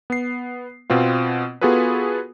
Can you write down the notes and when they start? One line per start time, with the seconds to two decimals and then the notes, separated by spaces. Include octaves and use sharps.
0.10 B3 C7
0.90 B2 B3 C4 F4
1.61 B3 F4 F#4 G#4 A4 B4